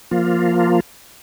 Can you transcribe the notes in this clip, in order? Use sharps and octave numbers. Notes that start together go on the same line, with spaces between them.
F3 A#3 F4